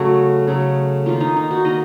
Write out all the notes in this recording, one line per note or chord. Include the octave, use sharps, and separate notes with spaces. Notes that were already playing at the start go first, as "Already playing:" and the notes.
Already playing: C#3 F#3 A3 F#4
C#3 F#3 A3
D#3 A#3 F4
D#4
D#4
F#4
D#3 A#3 D#5